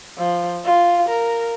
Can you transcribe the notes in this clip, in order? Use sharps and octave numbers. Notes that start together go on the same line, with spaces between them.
F3
F4
A#4